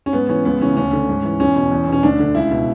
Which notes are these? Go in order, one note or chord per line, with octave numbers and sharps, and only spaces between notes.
C#4
G#2 B3
E3 C#4
C#2 B3
C#3 E3 C#4
D2 C#4
D3
G#2
E3
E2 C#4
B2
E2
B2
C#4
D2 D4
D3
C#2 E4
B2